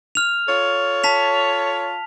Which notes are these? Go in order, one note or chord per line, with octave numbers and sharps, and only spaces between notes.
F6 F7
F4 A4 C#5
A5 B6 F7